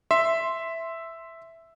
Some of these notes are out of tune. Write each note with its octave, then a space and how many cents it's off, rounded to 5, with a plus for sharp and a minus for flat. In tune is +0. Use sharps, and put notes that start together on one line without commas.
E5 +0 C6 +0